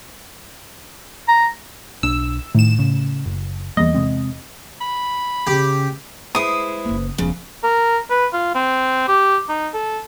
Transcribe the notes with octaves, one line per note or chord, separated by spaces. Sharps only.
A#5
B1 D4 E6
A2 D#3 E7
C#3
F#1
E2 G3 A#3 D#5
C3 G#3 C4
B5
C#3 G4
G#3 E4 B4 C5 D#6
F#1 A#3
E1 C#3 F3
A#4
B4
F4
C4
G4
D#4
A4